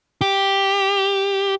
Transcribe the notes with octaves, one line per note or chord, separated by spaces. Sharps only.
G4